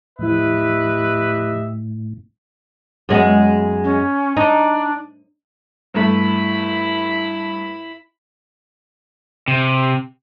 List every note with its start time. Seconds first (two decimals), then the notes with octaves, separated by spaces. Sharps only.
0.19 D#2 A2 F3 E4 G4 B4 D#5 E5
3.09 F#2 G#3 B3
3.84 C#4
4.37 D4 D#4
5.94 G2 A3 E4 B5
9.48 C3